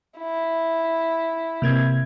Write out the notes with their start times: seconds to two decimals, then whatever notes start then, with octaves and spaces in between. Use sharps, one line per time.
0.19 E4
1.62 C3 A#3 G#6